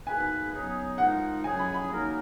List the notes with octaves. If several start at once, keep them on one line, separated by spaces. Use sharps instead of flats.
B2 A#3 D#4 G#4 B4 G#5
C#3 F#3 B3 D#4 G#4
F3 G#3 D#4 A#4 F#5
C#3 F#3 C#4 G#4 G#5
B5
B5
F#3 A#3 D#4 A#4